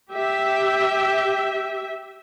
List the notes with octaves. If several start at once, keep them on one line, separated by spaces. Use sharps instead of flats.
G4 E5